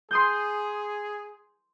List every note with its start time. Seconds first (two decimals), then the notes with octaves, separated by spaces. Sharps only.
0.11 G#4 C6 D#6 G6